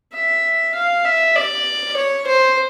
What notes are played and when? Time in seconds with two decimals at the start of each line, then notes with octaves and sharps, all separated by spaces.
0.14 E5
0.75 F5
1.05 E5
1.36 D5
1.96 C#5
2.26 C5